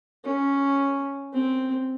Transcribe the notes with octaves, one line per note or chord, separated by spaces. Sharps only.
C#4
C4